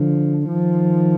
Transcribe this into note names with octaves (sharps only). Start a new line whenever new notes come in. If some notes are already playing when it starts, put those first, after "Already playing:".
Already playing: D3 F3
D#3 F3